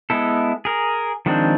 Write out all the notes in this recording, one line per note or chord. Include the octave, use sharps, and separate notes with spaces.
G#3 B3 E4 A4
G#4 A#4
D#3 F3 G#3 C4 D4